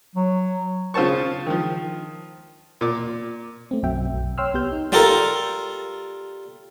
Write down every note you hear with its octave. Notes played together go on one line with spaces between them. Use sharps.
F#3
C#3 F4 C5 A5 C#6
D#3 F3
A#2 D6
A3 C4
B1 F#2 F#3 F#4 E5 G5
B1
C#5 G5 C6 E6 F6
C2 B3 G4 G6
D#4
G3 F4 G4 A4 A#4